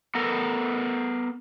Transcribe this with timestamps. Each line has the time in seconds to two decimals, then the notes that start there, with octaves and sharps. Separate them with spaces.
0.15 B3 A4 A#4